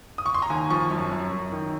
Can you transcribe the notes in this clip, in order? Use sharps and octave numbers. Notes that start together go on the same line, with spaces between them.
D#6
C#6
C6
A#5
D#2 G#5
F3 C#6
F#2
F#2
F#2
D#3